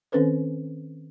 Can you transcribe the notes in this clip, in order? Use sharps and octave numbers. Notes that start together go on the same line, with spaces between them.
D#3 C4 C#4 A4 B4 C5